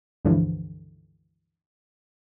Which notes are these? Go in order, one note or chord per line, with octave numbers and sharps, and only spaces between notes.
C#2 G2 D3 E3 F3